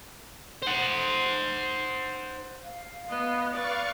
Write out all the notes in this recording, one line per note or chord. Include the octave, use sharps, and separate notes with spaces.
C5 F#5
F5
B3 D#5
B4 D5 F5 C#6